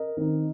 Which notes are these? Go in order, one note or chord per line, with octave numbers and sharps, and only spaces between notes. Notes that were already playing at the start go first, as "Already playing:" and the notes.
Already playing: A#4 D#5
D#3 C4 D#4